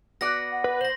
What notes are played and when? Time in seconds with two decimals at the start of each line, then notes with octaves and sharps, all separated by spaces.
0.21 B3 F#4 D5 A#6
0.51 F#5
0.64 B4
0.81 C5 A#6 F#7